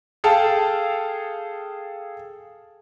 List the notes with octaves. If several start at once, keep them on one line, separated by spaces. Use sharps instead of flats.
G#4 A4 F5 G5 A5